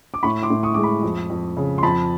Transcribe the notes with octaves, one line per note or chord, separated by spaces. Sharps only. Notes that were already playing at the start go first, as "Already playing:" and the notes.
D6
A2 B5 C#6
C6 D6
A2
C#6 D#6
G#3 D6
B5 C#6
F2
F2
C#3
C6
F2 A5 B5